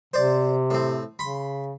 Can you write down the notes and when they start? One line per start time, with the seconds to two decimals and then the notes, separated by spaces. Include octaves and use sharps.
0.14 C3 C5 D5
0.70 A2 C4
1.19 C#3 B5 C6